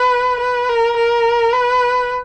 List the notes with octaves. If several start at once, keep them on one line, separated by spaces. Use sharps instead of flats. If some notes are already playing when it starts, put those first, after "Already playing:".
Already playing: B4
B4
A#4
A#4
B4